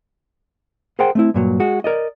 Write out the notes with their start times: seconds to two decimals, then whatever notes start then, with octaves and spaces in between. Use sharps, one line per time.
0.99 G#4 A#4 C5 F#5 G5
1.15 A3 C4 E4
1.34 G2 A#2 F#3
1.60 G#3 F#4
1.84 A#4 D5 D#5